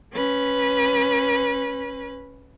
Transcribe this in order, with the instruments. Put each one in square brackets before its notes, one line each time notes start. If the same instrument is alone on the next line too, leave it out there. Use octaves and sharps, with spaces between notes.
[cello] C#4 B4